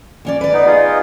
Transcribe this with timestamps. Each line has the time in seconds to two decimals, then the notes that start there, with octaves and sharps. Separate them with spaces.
0.25 D#2 C#4 D5
0.41 B4 D5
0.53 B3 D#4
0.66 D#4 F4 G#4